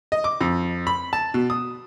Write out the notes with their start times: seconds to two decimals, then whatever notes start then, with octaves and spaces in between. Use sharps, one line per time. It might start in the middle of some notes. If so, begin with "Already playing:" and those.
0.12 D#5
0.24 D6
0.41 F2
0.87 B5
1.13 A5
1.34 B2
1.50 D#6